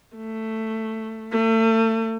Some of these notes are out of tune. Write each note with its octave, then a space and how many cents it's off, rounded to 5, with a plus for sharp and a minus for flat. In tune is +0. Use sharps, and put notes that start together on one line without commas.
A3 +10
A3 +35